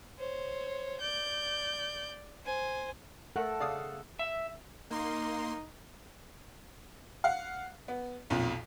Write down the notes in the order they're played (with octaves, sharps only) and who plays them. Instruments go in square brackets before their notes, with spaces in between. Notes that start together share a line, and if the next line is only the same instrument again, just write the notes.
[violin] C5 C#5
D5 G6
C5 G#5
[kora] A3 A#4 [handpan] A4 [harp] F#5
[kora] C#3 [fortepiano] D5 F5 D#6
[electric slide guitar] E5
[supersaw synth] A#3 C6 [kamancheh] D#4
[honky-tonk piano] F5 F#5
B3
B1 F2 A#2